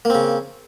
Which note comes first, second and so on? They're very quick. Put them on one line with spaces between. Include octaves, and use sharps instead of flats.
A#3 C4 C#3